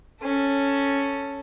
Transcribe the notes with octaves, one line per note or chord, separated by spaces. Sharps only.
C#4 A4